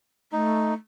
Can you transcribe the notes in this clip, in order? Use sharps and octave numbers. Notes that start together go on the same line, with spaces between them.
A3 D#4